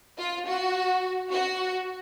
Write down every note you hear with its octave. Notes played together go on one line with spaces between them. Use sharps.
F4
F#4
F#4